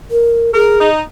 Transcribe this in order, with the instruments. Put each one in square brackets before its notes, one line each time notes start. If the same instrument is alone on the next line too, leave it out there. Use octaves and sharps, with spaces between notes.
[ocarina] A#4
[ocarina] G#4 [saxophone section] A#4
[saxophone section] D#4